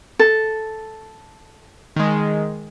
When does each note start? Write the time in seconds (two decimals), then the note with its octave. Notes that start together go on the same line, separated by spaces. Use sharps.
0.19 A4
1.96 D#3 G#3